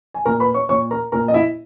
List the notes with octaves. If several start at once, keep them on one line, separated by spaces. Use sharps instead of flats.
G#5
A#2 A#4 A#5
B4 B5
C#5 C#6
A#2 C#5 C#6
A#4 A#5
A#2 A#4 A#5
D#5
E4 E5